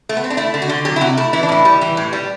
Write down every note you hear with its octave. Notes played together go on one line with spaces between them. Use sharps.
A3
B3
C4
D4
A3 E4
D3
F#4
D3
F#3 G4
E4
C3 F#4
A3 E4
E3 E4
D4
A2 E4
G3
E3
A2
G3